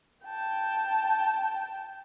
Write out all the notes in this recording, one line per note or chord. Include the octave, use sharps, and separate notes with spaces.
G5 A5